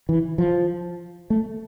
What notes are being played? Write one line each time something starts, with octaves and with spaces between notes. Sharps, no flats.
E3
F3
A3